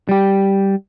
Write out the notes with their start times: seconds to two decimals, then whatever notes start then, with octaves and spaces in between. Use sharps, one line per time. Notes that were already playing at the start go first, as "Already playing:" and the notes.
0.09 G3 G4